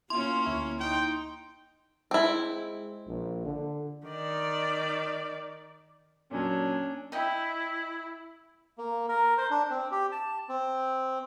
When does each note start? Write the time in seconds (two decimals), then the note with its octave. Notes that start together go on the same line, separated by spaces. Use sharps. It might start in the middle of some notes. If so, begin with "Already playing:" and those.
0.10 A#3 C#4 E4 F4 C6
0.45 D2 E4 C#6
0.80 D#4 G5
2.11 G#3 C4 E4
3.07 A#1
3.45 D3
4.07 D#3 D5
6.31 A#2 F#3 C#4 D4
7.12 E4 D#5 G5
8.78 A#3
9.08 A#4
9.38 C5
9.50 D4
9.71 C4
9.91 G4
10.12 A5
10.49 C4